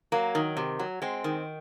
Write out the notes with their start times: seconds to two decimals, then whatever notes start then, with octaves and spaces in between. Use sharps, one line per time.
0.12 F#3 A#3
0.35 D#3
0.57 C3
0.79 F#3
1.02 G#3 C4
1.24 D#3